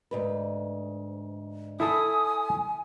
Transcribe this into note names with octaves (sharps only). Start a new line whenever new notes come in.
D2 G#2 B4
E4 A4 G#5 A5 D#6